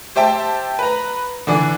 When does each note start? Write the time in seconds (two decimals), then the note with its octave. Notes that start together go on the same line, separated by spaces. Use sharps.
0.16 G4 C5 E5 G5 A5
0.79 B4 A#5
1.47 D3 E3 D4